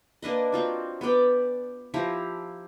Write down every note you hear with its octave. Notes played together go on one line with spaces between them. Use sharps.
A#3 D4 B4 D#5
C4 F4 F#4
B3 B4 D5 G5
F3 E4 G4 A#5